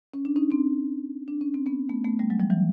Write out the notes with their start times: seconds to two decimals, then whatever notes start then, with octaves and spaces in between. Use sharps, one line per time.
0.14 C#4
0.25 D4
0.36 C#4 D#4
0.50 C4 D4
1.28 D4
1.41 C#4
1.54 C4
1.66 B3 C#4
1.89 A3 B3
2.04 A3 B3
2.19 G3 A3
2.30 F#3 G#3
2.40 F3 G3
2.50 E3 F#3